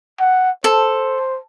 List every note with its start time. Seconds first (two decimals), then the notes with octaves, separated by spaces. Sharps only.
0.20 F#5
0.64 A4 C5